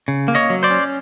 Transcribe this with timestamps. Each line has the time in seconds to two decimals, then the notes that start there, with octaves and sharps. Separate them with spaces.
0.08 C#3
0.28 A#3
0.35 C#5 D#5
0.50 F#3
0.63 C5 D5
0.70 C#4